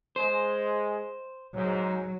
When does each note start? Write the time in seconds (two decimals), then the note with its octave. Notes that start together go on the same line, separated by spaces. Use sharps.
0.16 G#3 C5
1.54 G#2 F#3